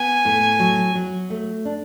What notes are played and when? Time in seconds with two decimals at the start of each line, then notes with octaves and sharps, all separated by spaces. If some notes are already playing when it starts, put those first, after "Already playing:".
Already playing: B3 G#5
0.25 A2
0.59 F#3
0.95 F#3
1.30 A3
1.65 D4